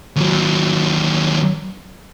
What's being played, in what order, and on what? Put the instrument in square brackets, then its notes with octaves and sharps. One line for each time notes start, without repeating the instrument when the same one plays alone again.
[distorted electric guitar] D#2 F#3